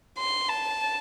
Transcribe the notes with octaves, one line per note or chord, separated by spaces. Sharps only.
C6
A5